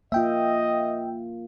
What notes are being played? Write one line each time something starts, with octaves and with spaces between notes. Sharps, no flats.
A#3 F4 D#5 E5 G5